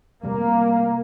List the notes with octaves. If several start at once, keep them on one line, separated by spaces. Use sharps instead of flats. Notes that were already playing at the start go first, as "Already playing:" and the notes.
C3 G3 A3 A#3